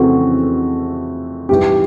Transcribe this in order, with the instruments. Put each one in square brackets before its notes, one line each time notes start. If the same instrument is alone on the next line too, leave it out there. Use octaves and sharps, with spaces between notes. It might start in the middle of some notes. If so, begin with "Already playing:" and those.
Already playing: [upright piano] F2 C#3 E3 A3 C4 [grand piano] F#4
[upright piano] G#2 E3 G3 [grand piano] G4